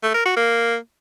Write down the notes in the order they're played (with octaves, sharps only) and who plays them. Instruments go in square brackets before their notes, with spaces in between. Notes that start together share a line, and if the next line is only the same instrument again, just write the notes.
[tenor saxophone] A3
A#4
F#4
A#3